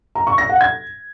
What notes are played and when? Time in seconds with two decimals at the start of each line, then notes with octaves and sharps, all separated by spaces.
0.15 A#5
0.27 C#6
0.38 A#6
0.49 F#5
0.61 G#6